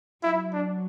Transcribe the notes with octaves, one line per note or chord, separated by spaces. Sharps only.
F#3 E4
D4